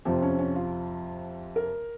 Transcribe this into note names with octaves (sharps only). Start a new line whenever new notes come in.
F2 C3 F3 C4
C#4
C#4
F4
A#4